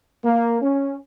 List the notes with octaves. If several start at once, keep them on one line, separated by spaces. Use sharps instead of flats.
A#3
C#4